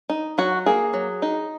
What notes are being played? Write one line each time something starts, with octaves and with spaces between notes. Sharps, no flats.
D#4
F#3 F#4
A#3 G#4
F#3
D#4